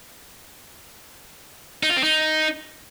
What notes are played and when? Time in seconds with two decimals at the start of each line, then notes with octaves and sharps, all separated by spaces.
1.83 D#4
1.90 F4
1.97 C4
2.03 D#4